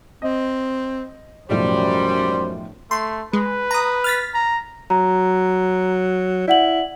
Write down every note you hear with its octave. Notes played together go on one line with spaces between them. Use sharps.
C4 D#5
B1 F#2 A2 F3 G3 C5
A3 C6
G#3 B4
A#5 D#6
F6 A6 B6
A#5
F#3 A#5
E4 D5 F#5 F#7